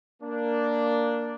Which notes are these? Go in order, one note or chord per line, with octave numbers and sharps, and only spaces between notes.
A#3 D4